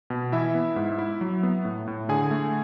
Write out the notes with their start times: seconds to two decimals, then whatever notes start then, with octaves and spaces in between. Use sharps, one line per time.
0.10 B2
0.32 E3 E4 E5
0.55 B3
0.76 G#2
0.98 E4
1.21 F#3
1.43 B3
1.65 A2
1.87 A2
2.09 D3 G#4 G#5
2.31 A3